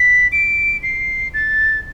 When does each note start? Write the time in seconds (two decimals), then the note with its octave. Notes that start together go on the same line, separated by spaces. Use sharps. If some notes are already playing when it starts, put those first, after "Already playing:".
Already playing: B6
0.32 D7
0.83 C7
1.34 A6